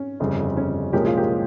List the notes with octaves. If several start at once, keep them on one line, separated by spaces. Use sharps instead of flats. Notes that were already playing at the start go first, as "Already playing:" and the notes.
Already playing: C#4
G1 F2 C#3 G3
C#4
C2 A#2 F3 G#3 C#4 G4 A#4
F4 G#4
G4 A#4